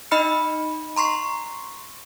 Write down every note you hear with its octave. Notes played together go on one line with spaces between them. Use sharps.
D#4 D#5 B5 F6 C#7
A#5 C6 C#6 C7